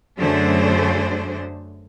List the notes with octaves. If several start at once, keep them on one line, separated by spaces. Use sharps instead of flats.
F#2 D3 A3 D4 G#4 C5